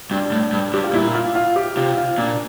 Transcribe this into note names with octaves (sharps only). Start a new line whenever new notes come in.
G2 D4
A2
G2
G2 G4
F4
A#2 E4
F4
F4
G4
C3 F4
F4
A#2 D4